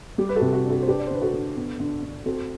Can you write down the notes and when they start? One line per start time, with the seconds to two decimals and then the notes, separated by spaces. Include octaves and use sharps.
0.18 G3 G4
0.29 B4
0.36 F#4 A4
0.41 C3
0.53 F#4
0.65 D4
0.70 F#4 A4
0.82 C5
0.88 D4 G4 B4
0.99 D5
1.07 C5
1.11 D3 B4
1.22 F#4 A4
1.33 D3
1.56 B3
1.80 D3
2.02 D3
2.26 C4 F#4 A4